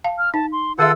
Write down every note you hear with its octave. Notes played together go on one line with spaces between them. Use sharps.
F5 A5
F6
D#4 A5
C6
D#3 F4 G#4 A4 E5 F#5 E6